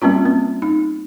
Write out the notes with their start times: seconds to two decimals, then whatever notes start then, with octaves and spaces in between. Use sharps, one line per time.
0.02 G3 A#3 C4 C#4 F4
0.25 C4
0.62 D#4